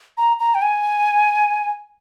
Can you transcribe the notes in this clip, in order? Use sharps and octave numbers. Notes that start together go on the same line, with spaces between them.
A#5
A#5
G5
G#5